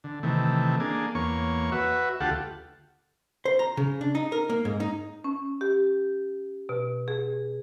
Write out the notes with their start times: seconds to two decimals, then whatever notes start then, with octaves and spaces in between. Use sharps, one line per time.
0.04 D3
0.23 C3 D#3 E3 A3
0.80 A#3 D4 G#4
1.15 E2 A#3 C#5 C#6
1.72 F#4 B4 E5
2.20 D2 F4 G4 A4 F#5
3.45 C5
3.59 A#5
3.77 C#3
4.01 D4
4.15 D#4
4.32 A#4
4.50 A#3
4.65 G#2
4.80 D#4
5.24 C#4
5.61 G4
6.69 B2
7.08 G#4